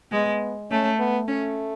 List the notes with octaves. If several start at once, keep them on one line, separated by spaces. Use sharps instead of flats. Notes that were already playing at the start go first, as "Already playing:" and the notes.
G#3 B3
A3 C#4
B3
A3 C#4